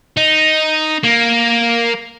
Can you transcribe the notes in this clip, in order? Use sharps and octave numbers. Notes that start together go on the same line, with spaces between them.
D#4
A#3